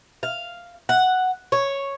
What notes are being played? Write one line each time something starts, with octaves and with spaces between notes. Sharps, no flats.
F5
F#5
C#5